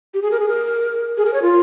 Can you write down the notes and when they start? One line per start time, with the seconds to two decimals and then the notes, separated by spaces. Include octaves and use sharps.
0.14 G4
0.22 G#4
0.31 A#4
0.40 G#4
0.49 A#4
1.17 G#4
1.25 A#4
1.34 C#5
1.42 F4